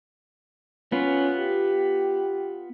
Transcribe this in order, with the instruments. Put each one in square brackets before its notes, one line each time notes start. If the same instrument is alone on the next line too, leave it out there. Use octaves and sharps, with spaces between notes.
[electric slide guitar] B3 F4 [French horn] C#4
[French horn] G4